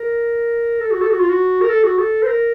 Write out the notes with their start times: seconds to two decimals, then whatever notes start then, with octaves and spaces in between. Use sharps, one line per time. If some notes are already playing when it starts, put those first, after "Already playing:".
Already playing: A#4
0.81 A4
0.91 F#4
1.01 A4
1.10 F#4
1.20 F4
1.30 F#4
1.61 A#4
1.69 A4
1.83 F#4
1.98 A4
2.23 C5
2.28 A#4